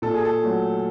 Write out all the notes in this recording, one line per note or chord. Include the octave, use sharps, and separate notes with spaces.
A#2 A4
G#4
A4
F#3 A3